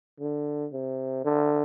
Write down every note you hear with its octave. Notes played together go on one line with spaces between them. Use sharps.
D3
C3
D3